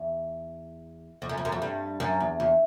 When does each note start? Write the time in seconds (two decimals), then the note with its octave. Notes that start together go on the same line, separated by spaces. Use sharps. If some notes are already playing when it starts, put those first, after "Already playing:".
Already playing: E2
1.22 F2
1.29 F#2
1.38 F2
1.45 F#2
1.52 F2
1.62 G2
2.00 F#2
2.20 E2
2.40 E2